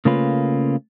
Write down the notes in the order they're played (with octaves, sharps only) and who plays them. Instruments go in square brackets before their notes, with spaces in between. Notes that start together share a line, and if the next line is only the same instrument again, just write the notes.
[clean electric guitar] C#3 A3 A#3 C#4 F4 B4